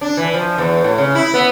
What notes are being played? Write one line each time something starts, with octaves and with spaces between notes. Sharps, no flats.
D4
E3
F3
E2
A2
C#3
E4
B3